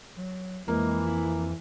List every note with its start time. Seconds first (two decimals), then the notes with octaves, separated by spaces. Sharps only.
0.18 F#3
0.68 F2 E3 G#3 A#3
1.06 E4